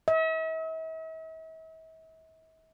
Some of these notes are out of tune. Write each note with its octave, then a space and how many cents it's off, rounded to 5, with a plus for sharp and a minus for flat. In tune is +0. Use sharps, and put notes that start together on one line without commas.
E5 -45